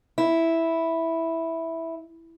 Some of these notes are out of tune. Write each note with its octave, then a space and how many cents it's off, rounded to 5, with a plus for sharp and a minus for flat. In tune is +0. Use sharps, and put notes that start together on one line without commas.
E4 -5